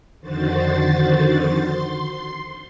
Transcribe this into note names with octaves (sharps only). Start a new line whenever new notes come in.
F2 D3 D#3 F#4 C5 A6
C6